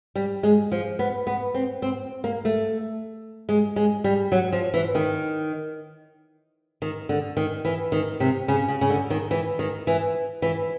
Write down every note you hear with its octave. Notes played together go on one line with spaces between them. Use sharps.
G3
G#3
F3
B3
B3
C4
C4
A#3
A3
G#3
G#3
G3
F#3
F3
E3
D#3
D#3
D3
D#3
E3
D#3
C3
C#3
C#3
C#3
D3
D#3
E3
D#3
E3
E3